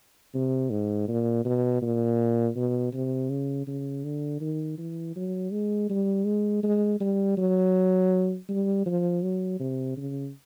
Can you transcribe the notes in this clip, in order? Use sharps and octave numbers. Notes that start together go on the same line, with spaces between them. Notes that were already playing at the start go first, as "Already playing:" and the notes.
C3
G#2
A#2
B2
A#2
B2
C3
C#3
C#3
D3
D#3
E3
F#3
G#3
G3
G#3
G#3
G3
F#3
G3
F3
F#3
C3
C#3